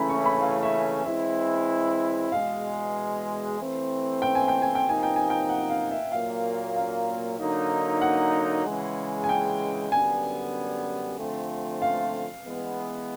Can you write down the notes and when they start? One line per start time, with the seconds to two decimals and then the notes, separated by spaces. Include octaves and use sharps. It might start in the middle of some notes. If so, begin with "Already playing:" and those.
Already playing: C#3 E3 A3 C#4 E4 A#5 B5
0.09 C#6
0.26 B5
0.41 F5
0.63 E5
1.05 E3 G#3 C4 E4 E5
2.31 E2 B2 G#3 F5
3.59 E3 A3 C4 E4
4.22 G5
4.35 G#5
4.48 G5
4.62 G#5
4.75 G5
4.85 C3 F3 A#3 D#4 G#5
5.03 G5
5.16 G#5
5.30 G5
5.49 F#5
5.70 F5
5.91 E5
6.12 A#2 F#3 A#3 F5
6.76 F5
7.39 D3 F#3 A#3 D#4
8.01 F#5
8.66 C#3 E3 G#3
9.24 G#5
9.29 G5
9.92 F#2 D3 G3 B3 G#5
11.19 D3 F3 A3 C4 F4
11.82 F5
12.46 E3 G#3 B3